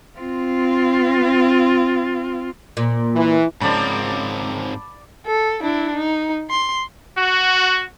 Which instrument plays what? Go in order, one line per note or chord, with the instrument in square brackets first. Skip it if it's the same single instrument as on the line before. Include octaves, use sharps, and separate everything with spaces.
[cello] C4 F4
[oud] A#2
[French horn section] E3
[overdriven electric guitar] G#2 C4 [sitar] C#3 F3 A#3 [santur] D5 A5 B5
[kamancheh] A4
D4 E4
D#4
C6
[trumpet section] F#4